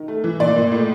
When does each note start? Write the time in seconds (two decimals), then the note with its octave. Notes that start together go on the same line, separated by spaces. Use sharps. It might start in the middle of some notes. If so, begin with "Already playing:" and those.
Already playing: D#3
0.08 A3
0.24 E3
0.40 A#2 D5
0.56 A#2
0.72 A2